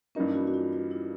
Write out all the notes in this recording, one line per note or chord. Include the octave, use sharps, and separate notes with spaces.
G2 E3 G3 A#3 C#4 D#4
F#4
F#4
F4
F4
E4